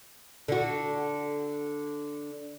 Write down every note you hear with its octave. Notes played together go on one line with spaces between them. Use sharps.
D3 F#4